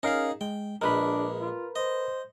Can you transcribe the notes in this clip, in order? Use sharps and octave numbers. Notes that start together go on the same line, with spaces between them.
C#4 D#4 G#4 A#4 F5
G#3 G5
A#1 G#3 D4 A#4 B4 B5
F4
C5 D#5